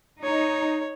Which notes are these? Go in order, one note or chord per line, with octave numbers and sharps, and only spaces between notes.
D#4 C#5